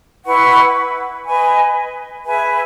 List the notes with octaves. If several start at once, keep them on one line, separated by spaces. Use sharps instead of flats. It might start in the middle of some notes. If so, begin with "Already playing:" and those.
E4 B4 F#5 C#6
B4 D#5 G#5
G#4 B4 E5 G#5